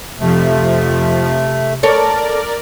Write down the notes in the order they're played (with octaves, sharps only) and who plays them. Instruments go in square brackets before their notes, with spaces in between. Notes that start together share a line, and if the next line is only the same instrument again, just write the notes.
[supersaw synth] F2 F3 [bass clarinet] C3 [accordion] A3
[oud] A4 C#5 [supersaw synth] A#4 D5